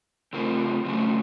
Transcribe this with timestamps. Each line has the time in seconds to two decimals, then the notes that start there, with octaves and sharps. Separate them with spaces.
0.33 C#3 A3 C4 F4 A#4
0.85 C#3 F#3 A3 C#4